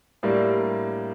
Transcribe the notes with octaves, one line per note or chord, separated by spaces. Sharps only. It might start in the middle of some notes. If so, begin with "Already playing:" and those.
A2 G3 A#3 D4